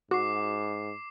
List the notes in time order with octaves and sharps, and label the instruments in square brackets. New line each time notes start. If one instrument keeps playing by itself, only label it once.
[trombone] G#2 [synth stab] F#4 [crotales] D6 C7